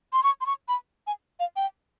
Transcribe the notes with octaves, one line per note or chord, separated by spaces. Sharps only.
C6
C#6
C6
C#6
B5
G#5
F5
G5